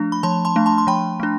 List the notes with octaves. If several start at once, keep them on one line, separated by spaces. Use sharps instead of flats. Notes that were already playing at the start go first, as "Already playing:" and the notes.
Already playing: F3 A3 D4
B5
F3 A5 C6
A5 C6
A3 D4
A5 C6
C6
F3 G5 B5
A3 D4